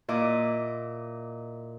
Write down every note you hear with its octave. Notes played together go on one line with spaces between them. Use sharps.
A#2 E4 D#5 D6